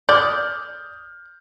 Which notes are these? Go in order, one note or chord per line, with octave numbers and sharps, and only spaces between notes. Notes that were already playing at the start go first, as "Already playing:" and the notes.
D5 D#6 F6 G6